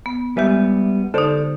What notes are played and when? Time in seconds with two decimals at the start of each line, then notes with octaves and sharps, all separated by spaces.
0.06 B3
0.37 G3 G#3 B3 G4 E5
1.14 D3 D#4 A4 C5 D5